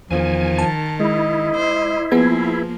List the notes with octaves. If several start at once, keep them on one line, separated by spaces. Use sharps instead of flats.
E2 D#3 F3 G#5
A5
G#3 E4 D#5
C5
F3 A#3 B3 G#4 G#6